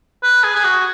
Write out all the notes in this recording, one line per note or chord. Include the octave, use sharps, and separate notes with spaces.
B4
G#4
G#4
F#4